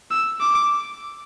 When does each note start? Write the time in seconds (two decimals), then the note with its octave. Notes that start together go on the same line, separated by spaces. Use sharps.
0.11 E6
0.41 D6